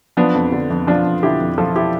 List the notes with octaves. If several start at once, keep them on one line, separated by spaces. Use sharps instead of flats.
F3 B3 D4
F2
D3
F2
F3 D4 F4
F2
D3 E4 G4
F2
F3 F4 A4
E4 G4